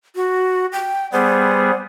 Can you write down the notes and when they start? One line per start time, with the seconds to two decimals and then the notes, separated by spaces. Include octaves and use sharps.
0.16 F#4
0.72 G5
1.12 G3 B3 G#4 C5